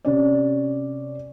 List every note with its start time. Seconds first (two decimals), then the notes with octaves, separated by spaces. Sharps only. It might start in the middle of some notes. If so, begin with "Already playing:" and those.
0.05 C3 C#4 D5